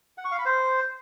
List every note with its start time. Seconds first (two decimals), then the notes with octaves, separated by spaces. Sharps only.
0.18 F#5
0.25 C#6
0.32 F5
0.38 B5
0.45 C5